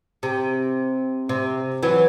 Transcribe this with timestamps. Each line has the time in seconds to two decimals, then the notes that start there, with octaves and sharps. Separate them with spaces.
0.23 C3
1.29 C3
1.83 E3 F#3